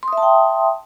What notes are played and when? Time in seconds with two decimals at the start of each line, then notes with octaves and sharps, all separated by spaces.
0.03 C6
0.08 D#6
0.13 E5
0.17 A5
0.22 G5